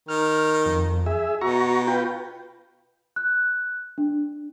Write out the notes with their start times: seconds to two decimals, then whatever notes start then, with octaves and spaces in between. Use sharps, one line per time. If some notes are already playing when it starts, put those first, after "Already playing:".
0.09 D#3 F6
0.66 F2
1.06 G#4 E5
1.41 B2 F#4 A#5 C#6
1.88 F4 B4 G5
3.16 F#6
3.98 D4